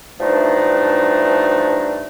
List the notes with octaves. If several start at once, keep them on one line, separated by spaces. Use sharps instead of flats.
G2 E3 F3 A3 D4 D#4